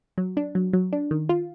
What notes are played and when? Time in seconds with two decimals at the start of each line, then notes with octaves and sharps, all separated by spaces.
0.18 F#3
0.37 D4
0.55 F#3
0.73 F#3
0.93 D4
1.11 D#3
1.29 F4